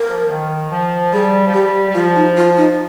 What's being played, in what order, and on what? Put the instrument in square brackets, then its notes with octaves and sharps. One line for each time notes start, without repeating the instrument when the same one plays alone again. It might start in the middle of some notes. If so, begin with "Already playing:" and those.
Already playing: [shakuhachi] A#4
[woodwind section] F3
F3
D#3
F3
[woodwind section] G3 [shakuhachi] G#4
[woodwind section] F3
[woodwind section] G3 [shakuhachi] G4
[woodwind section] G3
[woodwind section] F3 [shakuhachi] F4
[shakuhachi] D#4
F4
D#4